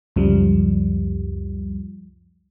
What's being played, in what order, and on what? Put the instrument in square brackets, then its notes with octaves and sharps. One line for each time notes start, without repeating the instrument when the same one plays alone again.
[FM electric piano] C#2 F#2 F3 G3